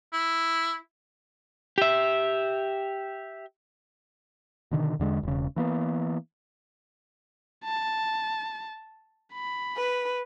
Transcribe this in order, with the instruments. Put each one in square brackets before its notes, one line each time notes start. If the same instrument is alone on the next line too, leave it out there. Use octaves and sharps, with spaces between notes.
[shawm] E4
[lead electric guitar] G4 E5
[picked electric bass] B2 D3 D#3
E2 D3 G#3
E1 C#3
E3 A#3 B3
[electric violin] A5
B5
[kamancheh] B4